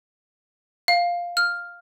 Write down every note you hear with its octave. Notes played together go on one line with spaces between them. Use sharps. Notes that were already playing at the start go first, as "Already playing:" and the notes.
F5
F6